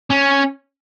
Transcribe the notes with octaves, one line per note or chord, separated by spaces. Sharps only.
C#4